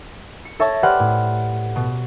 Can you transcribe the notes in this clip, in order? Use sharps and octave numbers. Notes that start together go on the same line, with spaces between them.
C#7
A4 C#5 E5 A5 C#6 A#6
G4 B4 C5 D5 F#5 F6
A2
B2